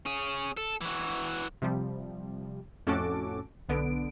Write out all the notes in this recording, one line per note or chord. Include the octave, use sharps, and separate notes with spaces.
C#4 G#4
A4
E3 F#4
C3 F3 G3
F2 A2 C#4 F#4 A4 D6
B1 D3 B3 D7